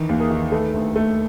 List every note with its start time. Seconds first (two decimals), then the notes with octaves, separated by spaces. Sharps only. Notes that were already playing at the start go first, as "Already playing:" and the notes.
Already playing: D#3 E3
0.09 D#2
0.20 G#4 A#4
0.31 D#3
0.52 A3 A4 B4
0.74 D2
0.96 A3